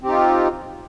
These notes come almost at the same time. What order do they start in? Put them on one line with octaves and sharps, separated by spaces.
C4 G4 D#4 F4